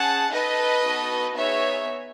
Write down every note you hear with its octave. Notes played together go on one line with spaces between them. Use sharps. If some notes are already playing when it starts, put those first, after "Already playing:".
Already playing: C#4 G#4 F#5 A5
D#4 A4 B4 D#5
B3 D#4 F#4 A4
B3 D#4 G#4 C#5 E5